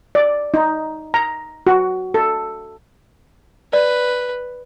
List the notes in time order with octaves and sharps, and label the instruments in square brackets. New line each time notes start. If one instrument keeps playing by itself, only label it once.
[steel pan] D5
D#4
A#5
F#4
A4
[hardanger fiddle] B4 [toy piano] D5